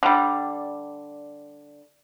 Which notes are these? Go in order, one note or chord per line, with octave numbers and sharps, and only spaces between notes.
D3 G3